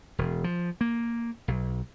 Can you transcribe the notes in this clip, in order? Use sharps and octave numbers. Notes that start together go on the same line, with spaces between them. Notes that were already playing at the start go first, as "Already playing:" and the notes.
E1
F3
A#3
B1